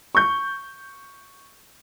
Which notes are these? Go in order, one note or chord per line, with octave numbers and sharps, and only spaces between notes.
C#6 G6